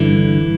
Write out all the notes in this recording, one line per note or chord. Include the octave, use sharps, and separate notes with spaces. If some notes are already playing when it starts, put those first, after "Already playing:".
Already playing: G2 D3 E3